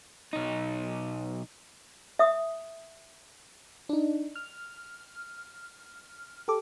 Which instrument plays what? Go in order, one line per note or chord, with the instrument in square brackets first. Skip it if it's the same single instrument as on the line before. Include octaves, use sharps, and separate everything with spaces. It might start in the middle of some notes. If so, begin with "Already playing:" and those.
[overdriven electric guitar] B1 D#4
[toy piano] E5 D#6
[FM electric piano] D4 D#4
F6
G4 A4 D6